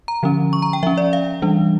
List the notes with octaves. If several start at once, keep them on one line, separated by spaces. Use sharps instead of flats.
A#5
D3 F3 C#4
C#6
A#5
G5
F3 C#4 E5
D5
F5
E3 G3 D4